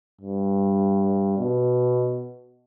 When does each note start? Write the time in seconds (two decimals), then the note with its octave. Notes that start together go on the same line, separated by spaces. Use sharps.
0.21 G2
1.38 B2